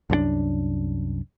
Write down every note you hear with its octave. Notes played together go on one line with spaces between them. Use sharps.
C2 F#2 F3 D4